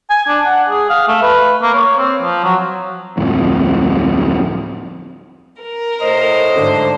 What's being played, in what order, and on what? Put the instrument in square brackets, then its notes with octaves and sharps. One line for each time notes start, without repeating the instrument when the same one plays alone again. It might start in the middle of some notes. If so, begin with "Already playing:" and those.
[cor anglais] G#5
D4
F#5
G#4
F5
A3
B4
A#3
C#5
C4
F3
F#3
[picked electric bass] D1 F2 A2
[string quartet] A#4
[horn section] A2 D#5 [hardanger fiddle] C5
[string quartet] G#2 D3